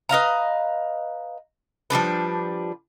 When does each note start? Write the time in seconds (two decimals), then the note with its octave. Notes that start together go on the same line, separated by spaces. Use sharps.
0.09 B4 D#5 F5 A#5
1.90 F3 G3 D4 B4